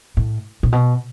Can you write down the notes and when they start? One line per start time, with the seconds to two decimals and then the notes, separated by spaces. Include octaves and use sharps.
0.17 A2
0.63 A#2
0.72 B2